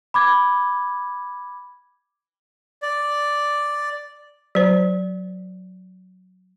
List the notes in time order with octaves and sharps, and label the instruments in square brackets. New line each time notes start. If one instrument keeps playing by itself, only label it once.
[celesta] B5 D6 G#6
[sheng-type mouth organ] D5
[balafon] F#3 C5